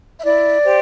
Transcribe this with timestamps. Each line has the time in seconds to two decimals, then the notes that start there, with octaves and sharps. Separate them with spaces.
0.20 E5
0.25 E4 D5
0.64 G4 C5